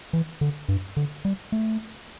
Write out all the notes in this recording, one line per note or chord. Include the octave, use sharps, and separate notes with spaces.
E3
D3
G2
D3
G3
A3